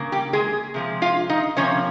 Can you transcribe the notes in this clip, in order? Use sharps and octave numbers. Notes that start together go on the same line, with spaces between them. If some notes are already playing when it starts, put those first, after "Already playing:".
Already playing: C#3 A#3
G3 G4
G#3 G#4
C3 F3 G#3
F4 F5
D#4 D#5
C3 F3 A#3 C#4 C#5